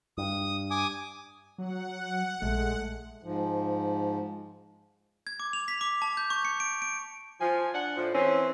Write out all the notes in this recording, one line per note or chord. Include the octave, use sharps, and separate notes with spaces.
G2 D#6
G#5 D6 D#6
F#3 F#5
A#1 G#3 A3
G#2 F3
G#6
D6
F7
B6
D6
A5
G6
C#6
C#7
D7
D7
F3 G#5
D4 F#5
A2 F3
E3 C4 C#4